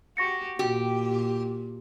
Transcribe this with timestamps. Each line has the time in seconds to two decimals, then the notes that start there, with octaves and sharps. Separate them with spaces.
0.17 F#4 G4 C#6 A#6 C#7
0.59 A#2 F#4 G4